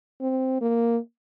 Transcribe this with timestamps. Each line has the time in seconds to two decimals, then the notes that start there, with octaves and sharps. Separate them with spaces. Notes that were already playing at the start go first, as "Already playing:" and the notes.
0.21 C4
0.61 A#3